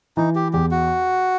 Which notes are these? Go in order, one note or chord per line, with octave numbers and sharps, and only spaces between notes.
E3 D#4
G4
E2 G4
F#4